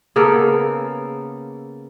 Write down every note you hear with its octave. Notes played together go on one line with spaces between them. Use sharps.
C#3 A#3 B3 A4